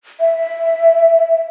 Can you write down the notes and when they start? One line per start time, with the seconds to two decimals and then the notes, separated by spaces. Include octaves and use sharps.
0.20 E5